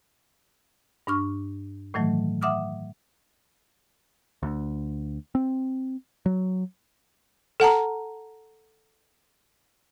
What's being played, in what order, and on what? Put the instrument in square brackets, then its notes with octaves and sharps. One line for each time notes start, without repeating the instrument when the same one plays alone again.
[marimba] G2 D4 C#6 F6
A2 D#3 E3 F#3 A3
E5 F#5 D6 D#6 F6
[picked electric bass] D2
C4
F#3
[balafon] A4 F#5 A5 A#5